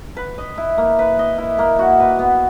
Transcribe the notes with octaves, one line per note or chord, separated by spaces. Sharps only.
B4
D#5
E4
A#3
B4
D#5
E4
A#3
F#4
B4
B3